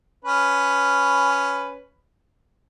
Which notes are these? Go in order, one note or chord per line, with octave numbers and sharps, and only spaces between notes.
C#4 B4